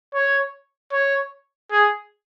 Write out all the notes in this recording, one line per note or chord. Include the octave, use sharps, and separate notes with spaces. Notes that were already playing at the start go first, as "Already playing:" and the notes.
C#5
C#5
G#4